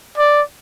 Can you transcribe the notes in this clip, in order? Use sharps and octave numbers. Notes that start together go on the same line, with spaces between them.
D5